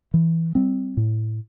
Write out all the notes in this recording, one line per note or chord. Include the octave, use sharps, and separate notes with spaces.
E3
G3 C4
A2